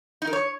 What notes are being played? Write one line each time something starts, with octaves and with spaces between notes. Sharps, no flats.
D#4
A#4
C#5